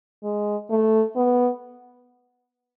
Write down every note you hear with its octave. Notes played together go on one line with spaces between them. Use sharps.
G#3
A3
B3